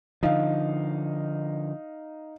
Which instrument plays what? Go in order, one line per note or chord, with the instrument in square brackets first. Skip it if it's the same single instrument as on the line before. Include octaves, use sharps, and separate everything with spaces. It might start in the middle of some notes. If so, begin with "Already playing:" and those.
[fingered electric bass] D3 F3 [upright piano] D#4 F5